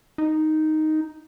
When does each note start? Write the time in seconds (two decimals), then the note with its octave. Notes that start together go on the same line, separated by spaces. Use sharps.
0.18 D#4